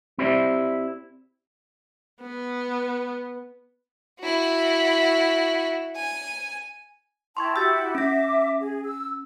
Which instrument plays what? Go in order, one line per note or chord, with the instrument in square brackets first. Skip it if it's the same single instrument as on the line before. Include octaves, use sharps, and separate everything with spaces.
[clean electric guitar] C4 E4 G4 C5 D5 E5
[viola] B3
[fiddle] E4 F#4
G#5
[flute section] E4 G5 A5 [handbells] C6 C#6 G#6
[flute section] E4 F#4 G4 [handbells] E6 G6 A6
[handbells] C#4 A#6 [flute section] E5 D6
[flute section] G#4
E6